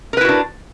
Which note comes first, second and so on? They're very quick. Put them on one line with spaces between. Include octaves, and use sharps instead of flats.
A#4 B4 E4 F#4 D4